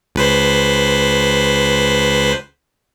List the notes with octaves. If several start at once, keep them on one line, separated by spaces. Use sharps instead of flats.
C#2 B4 C5